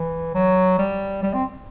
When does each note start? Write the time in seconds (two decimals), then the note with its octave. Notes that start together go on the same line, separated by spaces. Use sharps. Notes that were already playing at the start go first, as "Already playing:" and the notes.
Already playing: E3
0.35 F#3
0.79 G3
1.23 G3
1.34 C4